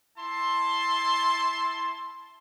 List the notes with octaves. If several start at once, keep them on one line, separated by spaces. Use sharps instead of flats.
E4 A5 C6